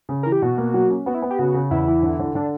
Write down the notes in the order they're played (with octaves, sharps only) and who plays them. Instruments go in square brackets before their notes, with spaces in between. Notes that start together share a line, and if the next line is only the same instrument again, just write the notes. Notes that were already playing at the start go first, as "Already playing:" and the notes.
[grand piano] C#3
[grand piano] E3 [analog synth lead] A#4
[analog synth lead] G4
[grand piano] B2 [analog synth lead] F#4
[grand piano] A#3
F#3
C#4
[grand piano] B3 [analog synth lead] F#4
[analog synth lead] E4
[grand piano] B3
[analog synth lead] G4
[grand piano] C#3 [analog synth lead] F#4
[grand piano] C#3
[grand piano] E2 [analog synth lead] E4
[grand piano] E3
D3
D3
[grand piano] D3 [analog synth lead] D4